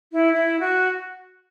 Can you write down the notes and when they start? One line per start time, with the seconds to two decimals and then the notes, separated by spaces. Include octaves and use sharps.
0.12 E4
0.33 E4
0.59 F#4